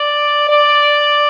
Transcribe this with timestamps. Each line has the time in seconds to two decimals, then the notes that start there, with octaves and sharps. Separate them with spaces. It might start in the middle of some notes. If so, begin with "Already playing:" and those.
Already playing: D5
0.48 D5